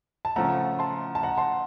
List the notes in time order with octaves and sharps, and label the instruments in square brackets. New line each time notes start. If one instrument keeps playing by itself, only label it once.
[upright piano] A5
[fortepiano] C#3 F3 A3 [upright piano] F#5 A#5
[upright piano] A5 C6
A5
F#5 A#5
A5 C6